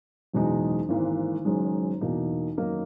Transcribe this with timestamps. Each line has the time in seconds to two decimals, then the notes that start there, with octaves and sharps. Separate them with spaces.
0.33 F#1 E2 B2 G#3 D#4
0.89 G#1 G#2 E3 A#3
1.45 F#1 F#2 D#3 G#3
2.01 E2 B2 A#3 D#4
2.58 F#2 D#3 A#3 D#4